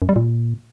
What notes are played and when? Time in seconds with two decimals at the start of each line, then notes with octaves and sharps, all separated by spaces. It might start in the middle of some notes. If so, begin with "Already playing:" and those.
0.02 F#2
0.09 G3
0.16 A#2